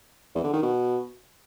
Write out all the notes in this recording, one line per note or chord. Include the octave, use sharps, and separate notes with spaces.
E2
D3
D#3
B2